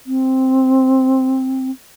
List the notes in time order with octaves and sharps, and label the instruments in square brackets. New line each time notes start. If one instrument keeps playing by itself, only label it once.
[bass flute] C4